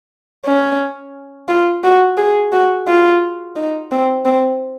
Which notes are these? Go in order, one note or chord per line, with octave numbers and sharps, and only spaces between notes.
C#4
F4
F#4
G#4
F#4
F4
D#4
C4
C4